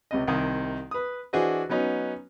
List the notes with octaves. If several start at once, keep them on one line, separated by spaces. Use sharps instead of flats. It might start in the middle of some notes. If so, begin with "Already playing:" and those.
C#2 C3 D#5
C2 C3 D#3 D#6
B4 D#6
E3 D4 F#4 G#4 C5 D#5
F#3 B3 C#4 D#4